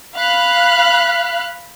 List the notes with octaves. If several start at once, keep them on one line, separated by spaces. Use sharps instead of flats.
F5 B5 F6 F#6